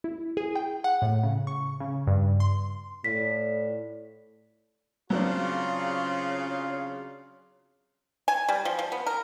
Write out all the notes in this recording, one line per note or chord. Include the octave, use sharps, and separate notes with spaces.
E4
G#4
G5
F#5
A2
C#3
C#6
C#3
G2
C6
A2 D4 F4 B4 B6
C#3 F#3 C4 D4 F4
G#5
G3
F3
F3
B3
A#4